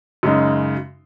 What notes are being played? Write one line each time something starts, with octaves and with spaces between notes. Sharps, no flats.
F#2 C#3 G#3 D#4